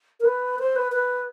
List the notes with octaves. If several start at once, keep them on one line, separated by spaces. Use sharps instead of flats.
A#4
B4
C5
B4
B4